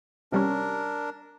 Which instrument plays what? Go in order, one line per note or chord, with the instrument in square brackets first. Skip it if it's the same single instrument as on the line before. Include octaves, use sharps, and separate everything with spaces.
[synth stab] C3 G3 C#4 [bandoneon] D4 A#4